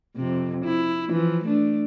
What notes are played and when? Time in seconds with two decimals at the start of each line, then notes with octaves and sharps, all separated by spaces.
0.17 F2 C3
0.64 E4
1.09 E3 F3
1.44 A3 D4